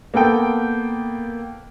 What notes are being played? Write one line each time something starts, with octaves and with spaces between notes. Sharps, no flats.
A#3 B3 A4 G5